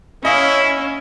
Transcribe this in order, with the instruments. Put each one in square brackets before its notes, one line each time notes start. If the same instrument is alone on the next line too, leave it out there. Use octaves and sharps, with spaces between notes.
[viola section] C#4 [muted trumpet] E4 [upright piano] D#5 F5